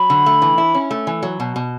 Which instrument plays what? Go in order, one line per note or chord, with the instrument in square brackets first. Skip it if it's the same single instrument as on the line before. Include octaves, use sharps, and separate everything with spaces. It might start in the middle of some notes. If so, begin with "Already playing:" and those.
Already playing: [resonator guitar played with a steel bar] F#3 [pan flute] B5
[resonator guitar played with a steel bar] D3
A3
E3
E4
C#4
A3
E3
F#3
B2
B2